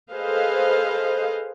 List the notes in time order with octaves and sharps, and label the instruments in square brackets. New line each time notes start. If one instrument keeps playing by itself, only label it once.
[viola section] G#4 A4 B4 C5 D#5 F5